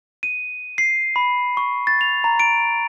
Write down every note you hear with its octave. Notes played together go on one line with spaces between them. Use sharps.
D#7
C7
B5
C#6
A6
F7
A#5
D7